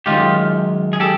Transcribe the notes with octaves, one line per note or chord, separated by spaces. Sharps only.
F#2 D#3 G#3 F4 G4
G#4
G4 A4